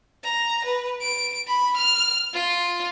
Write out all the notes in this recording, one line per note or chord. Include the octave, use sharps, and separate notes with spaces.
A#5
B4
D7
B5
F6
F4